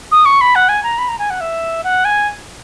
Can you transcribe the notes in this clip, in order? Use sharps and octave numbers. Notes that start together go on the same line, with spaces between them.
D#6
C#6
B5
F#5
G#5
A#5
B5
A#5
G#5
F#5
E5
F#5
G#5